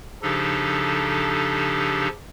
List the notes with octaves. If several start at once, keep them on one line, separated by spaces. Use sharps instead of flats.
C#3 F3 D4 D#4 G4 A4